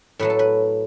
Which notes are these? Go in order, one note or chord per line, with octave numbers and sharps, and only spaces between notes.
A2 F#3 A3 B4
A4
B4